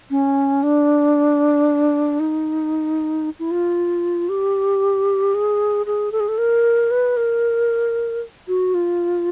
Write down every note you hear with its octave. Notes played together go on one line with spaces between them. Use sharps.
C#4
D4
D#4
E4
F4
G4
G#4
G#4
A4
G#4
A4
A#4
B4
A#4
F#4
F4